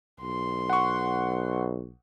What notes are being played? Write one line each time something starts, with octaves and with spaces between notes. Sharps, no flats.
B1 C6
F#5 C#6